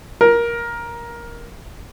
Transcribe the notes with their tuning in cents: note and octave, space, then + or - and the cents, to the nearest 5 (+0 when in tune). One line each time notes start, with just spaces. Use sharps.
A#4 +15